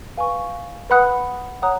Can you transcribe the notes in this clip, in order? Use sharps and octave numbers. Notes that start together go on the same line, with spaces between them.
B4 F5 G#5 C#6
B4 F#5 B5 D#6 F#6
C#5 F#5 A#5 D#6 F#6